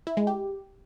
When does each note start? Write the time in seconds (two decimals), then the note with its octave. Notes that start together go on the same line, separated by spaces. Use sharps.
0.07 E4
0.17 G#3
0.27 G4